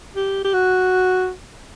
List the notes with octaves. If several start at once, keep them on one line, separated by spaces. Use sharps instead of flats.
G4
G4
F#4